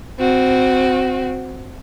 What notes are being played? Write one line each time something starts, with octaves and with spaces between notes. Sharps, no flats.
C4 F#4